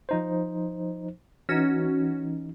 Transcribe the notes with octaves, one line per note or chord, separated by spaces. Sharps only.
F3 D#4 C5
E3 C#4 D#4 F#4